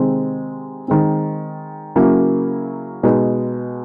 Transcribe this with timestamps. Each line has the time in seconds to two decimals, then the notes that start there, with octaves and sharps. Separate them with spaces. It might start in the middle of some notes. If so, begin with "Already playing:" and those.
Already playing: C3 D#3 G#3 C4
0.88 D#3 G#3 C4
1.96 C#3 F#3 A#3 C#4 E4
3.03 B2 G#3 B3 D#4